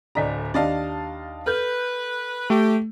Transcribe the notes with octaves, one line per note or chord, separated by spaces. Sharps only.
D1 D3 D5 D#5 A#5 B6
D#2 D4 D5 D#5 F5 A5
A4 B4 F6 G6
A3 G4